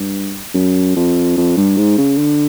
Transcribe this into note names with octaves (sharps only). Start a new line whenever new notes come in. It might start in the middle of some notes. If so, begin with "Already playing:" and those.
Already playing: G2
F#2
F2
F2
G2
G#2
C#3
D3